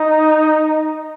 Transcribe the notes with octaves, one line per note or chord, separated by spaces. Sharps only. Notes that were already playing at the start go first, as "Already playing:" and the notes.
Already playing: D#4